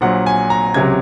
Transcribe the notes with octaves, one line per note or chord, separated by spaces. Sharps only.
A#1 A#2 F#3 F#5
G#5
A#5
C#2 C3 F#3 G#6